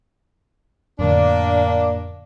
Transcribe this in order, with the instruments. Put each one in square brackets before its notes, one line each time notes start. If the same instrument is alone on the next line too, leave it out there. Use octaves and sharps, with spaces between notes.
[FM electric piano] F2 A2 D3 [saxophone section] A#3 D4